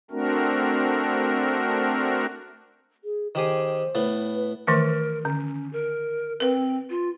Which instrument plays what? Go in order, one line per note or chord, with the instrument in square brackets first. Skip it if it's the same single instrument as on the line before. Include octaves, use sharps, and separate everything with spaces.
[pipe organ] A3 C4 D4 F#4 A#4
[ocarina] G#4
[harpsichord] D#3 G4 G#4 [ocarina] C5
[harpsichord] A2 B3
[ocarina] B4
[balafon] D#3 E3 A3 [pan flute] A#4
[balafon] D3 [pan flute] C#4
[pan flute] A#4
[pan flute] C4 [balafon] A#4 B4
[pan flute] F4